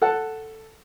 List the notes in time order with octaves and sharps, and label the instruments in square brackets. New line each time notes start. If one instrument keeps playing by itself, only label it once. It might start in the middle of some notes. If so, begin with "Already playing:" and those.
[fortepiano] A4 F#5 A5